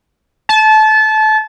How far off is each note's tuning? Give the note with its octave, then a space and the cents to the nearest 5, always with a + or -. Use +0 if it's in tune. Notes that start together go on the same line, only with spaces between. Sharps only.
A5 -25